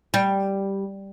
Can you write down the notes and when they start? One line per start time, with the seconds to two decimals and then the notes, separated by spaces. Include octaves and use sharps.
0.14 G3